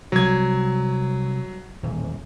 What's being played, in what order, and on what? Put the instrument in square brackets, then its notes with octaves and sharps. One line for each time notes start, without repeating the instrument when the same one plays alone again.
[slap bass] C3 G3 [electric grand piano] F#3 G#6
[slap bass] D#1 E2